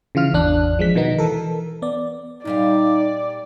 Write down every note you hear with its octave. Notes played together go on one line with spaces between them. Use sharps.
C#3 E3 F4 F6
G#1 E2 D4 F#6
F3 G#3 B6
B2 D#3 B3 D#4
E3 A4 A#4
B3 D5
A#2 G3 D#4 D5 F5